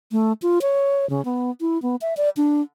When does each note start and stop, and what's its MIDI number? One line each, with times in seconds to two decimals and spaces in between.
0.12 0.33 57
0.42 0.59 65
0.62 1.08 73
1.10 1.24 49
1.25 1.51 59
1.61 1.81 64
1.82 1.96 59
2.01 2.14 76
2.17 2.29 74
2.37 2.62 62